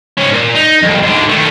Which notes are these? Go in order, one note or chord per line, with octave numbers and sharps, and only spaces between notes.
G#2 C#4
A#2
D#4
C2 F2
G#2 D3
D#3 A3